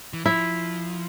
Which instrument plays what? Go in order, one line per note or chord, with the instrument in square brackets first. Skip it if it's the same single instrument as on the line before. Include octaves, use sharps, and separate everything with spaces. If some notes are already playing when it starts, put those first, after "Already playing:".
[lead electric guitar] E3
[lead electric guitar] F3 [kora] E4